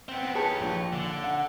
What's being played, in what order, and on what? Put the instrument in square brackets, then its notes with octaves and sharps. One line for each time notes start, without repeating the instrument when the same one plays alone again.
[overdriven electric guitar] B3 C4
[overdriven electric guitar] G4 C#5 [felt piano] G#4 B4 A5
[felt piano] A#1
[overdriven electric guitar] D3
[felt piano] F#5